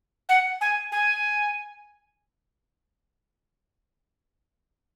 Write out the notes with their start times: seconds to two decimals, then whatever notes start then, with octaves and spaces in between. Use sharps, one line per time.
0.29 F#5
0.61 G#5
0.92 G#5